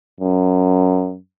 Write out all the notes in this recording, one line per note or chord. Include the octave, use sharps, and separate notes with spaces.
F#2